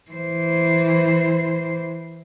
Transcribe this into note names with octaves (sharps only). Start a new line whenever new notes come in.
E3 C5